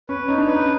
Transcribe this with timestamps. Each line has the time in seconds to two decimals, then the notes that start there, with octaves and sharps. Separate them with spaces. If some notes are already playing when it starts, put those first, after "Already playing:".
0.09 C#4 B4
0.28 C#4 D#4
0.38 D4
0.47 C#4 B4